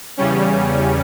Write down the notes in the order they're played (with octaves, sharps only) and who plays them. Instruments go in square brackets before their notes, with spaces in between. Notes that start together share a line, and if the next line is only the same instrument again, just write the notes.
[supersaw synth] E2 C#3 G3 C#4